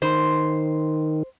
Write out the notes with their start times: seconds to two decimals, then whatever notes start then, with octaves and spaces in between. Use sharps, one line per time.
0.02 D#3 C5